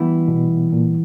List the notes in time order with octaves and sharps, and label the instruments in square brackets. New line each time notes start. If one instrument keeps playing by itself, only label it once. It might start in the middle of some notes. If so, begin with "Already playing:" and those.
Already playing: [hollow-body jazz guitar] E3 G3 B3 E4
[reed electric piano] B2
A#2